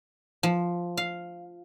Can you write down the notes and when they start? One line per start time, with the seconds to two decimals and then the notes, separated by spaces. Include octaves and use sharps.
0.43 F3
0.97 F5